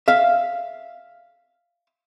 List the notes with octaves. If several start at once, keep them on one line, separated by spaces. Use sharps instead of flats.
E5 F5